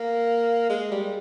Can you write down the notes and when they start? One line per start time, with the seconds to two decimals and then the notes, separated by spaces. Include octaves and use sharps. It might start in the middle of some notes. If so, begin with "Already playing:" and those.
Already playing: A#3
0.69 G#3
0.91 G3